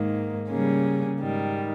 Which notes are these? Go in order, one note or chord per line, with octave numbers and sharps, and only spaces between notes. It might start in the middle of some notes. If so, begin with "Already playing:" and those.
Already playing: G#2 D#3 A#3
C#3 G3 A#3 C#4 G#4
G#2 D#3 G3